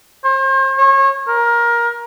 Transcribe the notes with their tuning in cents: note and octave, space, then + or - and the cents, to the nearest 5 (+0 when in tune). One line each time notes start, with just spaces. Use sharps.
C5 +40
C#5 -30
A#4 +20